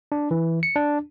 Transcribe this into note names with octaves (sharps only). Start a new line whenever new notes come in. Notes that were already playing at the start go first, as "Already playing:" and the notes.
D4
E3
C#7
D4